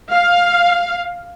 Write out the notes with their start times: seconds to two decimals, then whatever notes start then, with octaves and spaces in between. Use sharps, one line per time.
0.10 F5